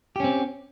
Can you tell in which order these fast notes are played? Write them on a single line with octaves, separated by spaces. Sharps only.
G4 C#4 C4